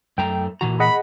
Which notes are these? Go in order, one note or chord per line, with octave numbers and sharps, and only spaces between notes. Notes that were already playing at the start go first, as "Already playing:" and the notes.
F#2 A3 G5 A#5
A#2 E3 F#4 A#5
G#4 D#5 F#5 B5